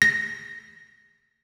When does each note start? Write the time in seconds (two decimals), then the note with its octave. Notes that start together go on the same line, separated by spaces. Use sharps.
0.02 A#6